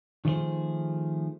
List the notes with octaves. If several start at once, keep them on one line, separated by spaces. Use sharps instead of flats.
D#3 F3 A3 C#4 G#4 C5